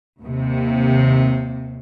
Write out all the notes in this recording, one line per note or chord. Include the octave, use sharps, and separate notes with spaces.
D#2 C3